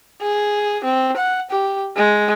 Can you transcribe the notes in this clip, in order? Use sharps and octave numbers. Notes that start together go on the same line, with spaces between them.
G#4
C4
F#5
G4
G#3